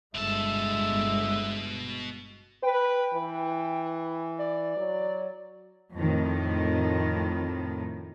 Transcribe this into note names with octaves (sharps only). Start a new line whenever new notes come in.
G1 B2 G#3 E5 A5
B4 G5
E3
D5
F#3
F2 A2 D#3